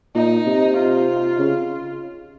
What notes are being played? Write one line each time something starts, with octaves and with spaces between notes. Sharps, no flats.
A#2 D#4
C3
F4
C#3